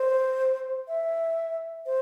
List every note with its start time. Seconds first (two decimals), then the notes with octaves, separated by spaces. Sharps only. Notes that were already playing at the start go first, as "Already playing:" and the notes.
Already playing: C5
0.88 E5
1.86 C5